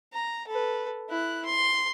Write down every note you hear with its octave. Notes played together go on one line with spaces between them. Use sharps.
A#5
A4 B4
E4 F#6
C6